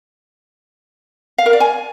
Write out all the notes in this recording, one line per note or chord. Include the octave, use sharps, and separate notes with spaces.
F5
A#4
D5
G#5